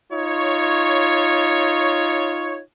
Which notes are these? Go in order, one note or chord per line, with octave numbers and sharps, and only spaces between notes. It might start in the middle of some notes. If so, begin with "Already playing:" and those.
D#4 F4 C#5